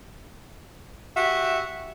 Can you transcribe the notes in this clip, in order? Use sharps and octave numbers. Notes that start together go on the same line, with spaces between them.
F#4 G4 E5